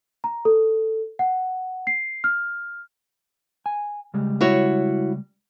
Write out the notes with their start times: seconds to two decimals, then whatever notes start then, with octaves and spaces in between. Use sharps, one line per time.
0.24 A#5
0.45 A4
1.19 F#5
1.87 C7
2.24 F6
3.66 G#5
4.14 C#3 G3 G#3
4.41 E4 F#4 C#5